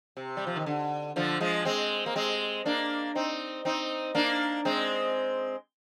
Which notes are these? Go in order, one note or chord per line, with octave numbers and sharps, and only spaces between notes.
C3
G3
F3
D#3
D3
D3 F3
F3 G#3
G#3 C4
A#3
G#3 C4
A#3 D4
C4 D#4
C4 D#4
A#3 D4
G#3 C4